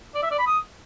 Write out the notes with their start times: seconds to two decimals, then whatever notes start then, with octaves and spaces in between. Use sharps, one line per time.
0.14 D5
0.22 E5
0.31 D5
0.39 B5
0.47 D#6